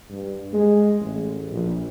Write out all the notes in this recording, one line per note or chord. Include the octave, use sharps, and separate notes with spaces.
G2
G#3
A1
A#1